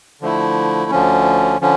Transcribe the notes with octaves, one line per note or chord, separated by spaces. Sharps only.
D3 F3 A3 E4
D2 D3 F3 C#4
D3 F3 C#4